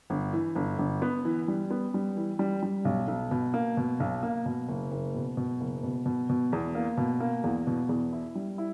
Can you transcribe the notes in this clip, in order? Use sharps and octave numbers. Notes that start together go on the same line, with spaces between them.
G1
E3
G1
G1
B3
E3
G3
B3
G3
E3
G3
G3
B1
B1
B2
A#3
B2
B1
A#3
B2
F#1
F#1
B2
B2
F#1
B2
B2
B2
E2
A#3
B2
A#3
E2
B2
E2
E4
G3
E4